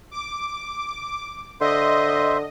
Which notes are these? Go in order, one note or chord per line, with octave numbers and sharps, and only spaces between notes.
D6
D3 C5 D#5 E5 C6